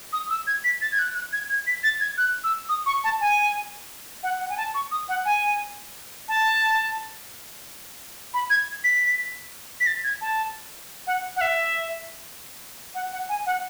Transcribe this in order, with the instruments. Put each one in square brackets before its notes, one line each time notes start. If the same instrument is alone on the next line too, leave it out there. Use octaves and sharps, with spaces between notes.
[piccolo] D#6
E6
G#6
B6
A6
G#6
F#6
F#6
G#6
G#6
B6
A6
G#6
F#6
E6
D#6
C#6
A5
G#5
F#5
F#5
G#5
A5
C#6
D#6
F#5
G#5
A5
B5
G#6
B6
B6
A6
G#6
A5
F#5
F#5
E5
F#5
F#5
G#5
F#5